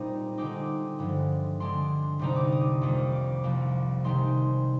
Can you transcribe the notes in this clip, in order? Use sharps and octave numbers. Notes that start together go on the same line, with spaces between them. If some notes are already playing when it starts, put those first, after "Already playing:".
Already playing: A#2 G3 C4 D#4 A#5
D3 G#3 C4 D#4 D6
G2 D3 F3 G#3
D3 G#3 D4 C6
C2 C3 G3 C4 D#4 A#5
D6
D#6
F2 D#3 G3 A#3
D6
C2 C3 F3 A#3
C3 D#3 G#3 D#4 C6